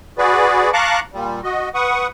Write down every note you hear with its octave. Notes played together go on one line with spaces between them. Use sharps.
F#4 G#4 B4 D5
F5 A5 A#5 C#6 D6 F#6
A#2 G3
F#4 D#5
B4 F#5 C#6 D#6